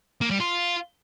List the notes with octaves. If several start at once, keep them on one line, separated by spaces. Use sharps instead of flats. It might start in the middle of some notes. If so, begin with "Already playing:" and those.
A#3
G3
F4